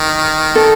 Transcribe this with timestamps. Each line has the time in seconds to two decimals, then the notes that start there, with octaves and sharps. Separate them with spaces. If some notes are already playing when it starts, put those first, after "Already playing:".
Already playing: D#3
0.55 A4